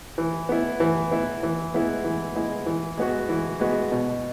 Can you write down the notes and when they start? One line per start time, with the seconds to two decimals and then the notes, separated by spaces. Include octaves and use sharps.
0.18 E3
0.49 B3 E4
0.80 E3
1.11 B3 E4
1.43 E3
1.74 G#3 B3 E4
2.04 E3
2.35 G#3 B3 E4
2.66 E3
2.97 G#3 B3 F#4
3.29 E3
3.60 G#3 B3 F#4
3.92 B2